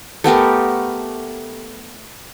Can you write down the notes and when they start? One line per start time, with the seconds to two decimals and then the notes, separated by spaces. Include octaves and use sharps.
0.24 A3 B3 G4 A#4